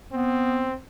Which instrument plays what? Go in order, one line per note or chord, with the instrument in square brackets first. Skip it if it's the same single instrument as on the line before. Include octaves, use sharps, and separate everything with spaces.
[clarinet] B3 [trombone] C4